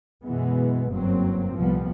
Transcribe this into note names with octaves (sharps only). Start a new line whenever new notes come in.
F#2 B2 E3 G#3 B3
F#1 E2 G2 F#3 A#3 C4
C2 F2 A#2 F3 G3 B3